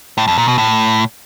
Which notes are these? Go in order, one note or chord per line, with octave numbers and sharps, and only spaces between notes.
A2
F2
A#2
B2
A2